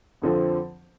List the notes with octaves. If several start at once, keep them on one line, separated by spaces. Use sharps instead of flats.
F2 D3 F3 C4